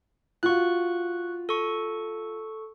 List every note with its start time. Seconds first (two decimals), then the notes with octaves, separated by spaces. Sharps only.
0.43 F4 F#4 F5 C#6 F#6
1.49 A4 C#6